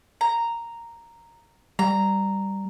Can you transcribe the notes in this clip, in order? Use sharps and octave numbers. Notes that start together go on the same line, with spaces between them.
A#5
G3 A#5